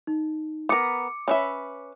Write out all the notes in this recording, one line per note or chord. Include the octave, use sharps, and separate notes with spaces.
D#4
B3 A#4 D6 C#7
C#4 B4 E5